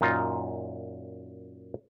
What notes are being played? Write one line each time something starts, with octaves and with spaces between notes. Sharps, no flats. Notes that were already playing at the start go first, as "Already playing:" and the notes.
F#2 A#2 D#4 F4